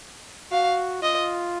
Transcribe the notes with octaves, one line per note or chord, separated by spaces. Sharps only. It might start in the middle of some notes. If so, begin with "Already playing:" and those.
F#4 F5
F4 D#5